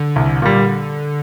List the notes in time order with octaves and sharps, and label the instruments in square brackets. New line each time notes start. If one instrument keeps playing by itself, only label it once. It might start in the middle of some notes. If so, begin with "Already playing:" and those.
Already playing: [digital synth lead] D3
[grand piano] C2
A#2 G3